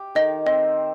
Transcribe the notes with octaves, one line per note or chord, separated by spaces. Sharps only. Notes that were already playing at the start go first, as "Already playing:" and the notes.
Already playing: G4
D#3 D#5
C4 D#5